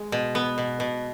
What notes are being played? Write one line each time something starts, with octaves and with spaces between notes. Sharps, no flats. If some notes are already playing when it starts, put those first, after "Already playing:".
Already playing: G#3
B2
B3
B2
B2